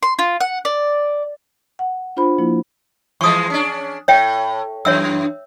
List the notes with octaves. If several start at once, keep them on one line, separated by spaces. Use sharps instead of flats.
C6
F4
F#5
D5
F#5
D4 F4 C5 B5
F3 A#3 E4
E3 F3 G#3 C#6 D#6
C#4 D4
A2 C#5 E5 G5
F#2 E3 C#5 E5 E6